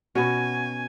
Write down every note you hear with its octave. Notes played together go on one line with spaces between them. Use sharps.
B2 C#4 F#4 G#5